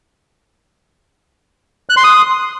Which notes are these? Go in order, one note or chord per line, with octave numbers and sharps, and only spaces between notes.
F#6
C6
D#6